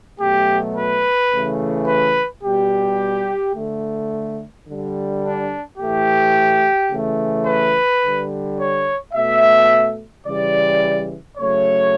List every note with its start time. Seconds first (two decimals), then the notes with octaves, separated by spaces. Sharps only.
0.20 B2 F#3 A3 G4
0.75 B4
1.31 C#3 E3 A3
1.86 B4
2.43 B2 G3 G4
3.55 D3 A3
4.66 D3 G3
5.23 D4
5.78 A2 E3 A3 G4
6.90 C#3 E3 A3
7.46 B4
8.02 D3 G3
8.58 C#5
9.14 B2 A3 E5
10.25 C#3 E3 G3 D5
11.38 C#3 F#3 A3 C#5